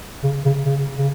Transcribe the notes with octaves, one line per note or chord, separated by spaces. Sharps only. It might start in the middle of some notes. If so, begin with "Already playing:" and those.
C#3
C#3
C#3
C#3